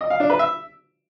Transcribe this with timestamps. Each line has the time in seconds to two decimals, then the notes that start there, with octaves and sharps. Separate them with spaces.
0.01 D#5
0.10 F5
0.20 D4
0.30 B4
0.39 E5